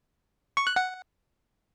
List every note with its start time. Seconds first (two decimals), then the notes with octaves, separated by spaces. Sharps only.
0.57 C#6
0.67 F#6
0.76 F#5